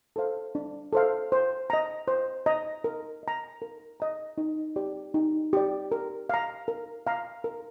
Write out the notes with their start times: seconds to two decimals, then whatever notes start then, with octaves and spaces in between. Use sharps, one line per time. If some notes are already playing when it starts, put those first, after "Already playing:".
0.16 A4 C5 F5
0.55 D4
0.93 A4 C5 F5
1.32 C5
1.70 D#5 A#5
2.08 C5
2.46 D#5 A#5
2.84 A#4
3.23 D#5 A#5
3.62 A#4
4.00 D#5 A#5
4.38 D#4
4.76 G4 D5
5.14 D#4
5.53 G4 D5
5.92 A#4
6.29 F5 A#5
6.68 A#4
7.07 F5 A#5
7.44 A#4